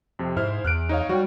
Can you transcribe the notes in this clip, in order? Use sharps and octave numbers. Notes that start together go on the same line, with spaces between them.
F2 C3
G#2 E4 C5 F6
E2 F6 F#6 D7
D#4 C#5 F5
G3 F#4 C#5 G5